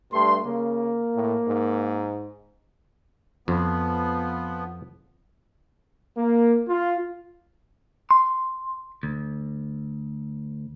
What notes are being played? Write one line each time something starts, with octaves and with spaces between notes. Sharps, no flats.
G2 A3 C6
C#3 A#3
A2
G#2
F2 F3 B3
A#3
F4
C6
D2